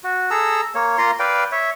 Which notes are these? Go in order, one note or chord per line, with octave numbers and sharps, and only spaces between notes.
F#4
G#4 A4 A#5 E6
A#3 C#5
A#3 F4 A#5 C6
B4 D5 F5 G5
C#5 E5